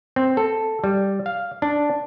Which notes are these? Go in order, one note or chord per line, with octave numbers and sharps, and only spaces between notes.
C4
A4
G3
F5
D4